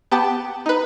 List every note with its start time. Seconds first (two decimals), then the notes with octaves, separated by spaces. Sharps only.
0.11 B3 G4 A5
0.66 D#4 B4